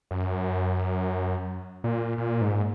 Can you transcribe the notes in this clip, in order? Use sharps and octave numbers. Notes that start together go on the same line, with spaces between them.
F#2
A#2
A#2
G#2